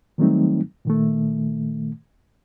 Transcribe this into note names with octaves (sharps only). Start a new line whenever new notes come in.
D#3 F#3 G3 A3 C4 D#4
A#2 D#3 A3